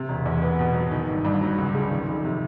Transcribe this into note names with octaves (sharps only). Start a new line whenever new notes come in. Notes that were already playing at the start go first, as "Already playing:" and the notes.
Already playing: C3
E1
E2
B3
B2
F#3
D#3
G1
G2
F#3
C#2
C#3
D#3
F2
C3